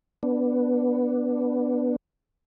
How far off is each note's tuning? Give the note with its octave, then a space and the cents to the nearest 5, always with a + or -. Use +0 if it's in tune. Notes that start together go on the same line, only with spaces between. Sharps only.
B3 +0 D4 +0